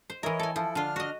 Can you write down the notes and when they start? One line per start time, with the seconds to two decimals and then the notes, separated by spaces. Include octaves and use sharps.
0.10 C5
0.23 E3 E4 A#4 C#5 D#5
0.40 A4 G#5
0.56 F3 E4 A4
0.75 D3 D4 F4 F6
0.96 F#4 D#5